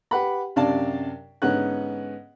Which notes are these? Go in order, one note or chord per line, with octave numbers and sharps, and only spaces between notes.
G4 B4 F#5 B5
F#2 C3 D4 D5 F5 A5
G#2 D3 B3 C#4 F#5 F#6